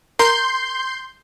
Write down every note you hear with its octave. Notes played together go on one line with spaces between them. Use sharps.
A#4 C6 G6